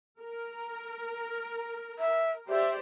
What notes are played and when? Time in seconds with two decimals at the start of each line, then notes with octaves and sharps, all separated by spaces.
0.21 A#4
1.99 E5
2.49 G4 C5 D5 E5